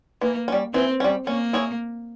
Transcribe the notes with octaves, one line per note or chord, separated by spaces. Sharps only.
E3 A#3
G3 C#4
E3 C4
G3 C#4
A#3 C#4
E4 G#4 C#5